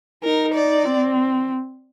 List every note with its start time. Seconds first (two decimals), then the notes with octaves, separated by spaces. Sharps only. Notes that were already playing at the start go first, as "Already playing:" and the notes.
0.24 D#4 A#4
0.54 D5
0.85 C4